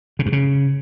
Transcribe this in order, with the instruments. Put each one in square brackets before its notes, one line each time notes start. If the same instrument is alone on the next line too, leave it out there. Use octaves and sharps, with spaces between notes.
[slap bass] C#3
G2
C#3